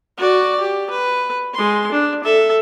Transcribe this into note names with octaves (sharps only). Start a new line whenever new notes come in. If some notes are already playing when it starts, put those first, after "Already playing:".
F#4 D5
G4
B4
G#3 C6
D4
A4 E5